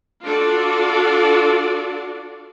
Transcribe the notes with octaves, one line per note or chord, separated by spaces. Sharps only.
D4 F4 F#4 A4 D5